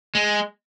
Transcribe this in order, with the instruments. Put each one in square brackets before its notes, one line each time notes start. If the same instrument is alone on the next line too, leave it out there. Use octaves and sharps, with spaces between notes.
[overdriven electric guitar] G#3